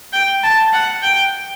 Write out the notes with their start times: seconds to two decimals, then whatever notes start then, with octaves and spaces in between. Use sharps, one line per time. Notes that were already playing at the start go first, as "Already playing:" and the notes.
0.13 G5
0.43 A5
0.73 F#5
1.02 G5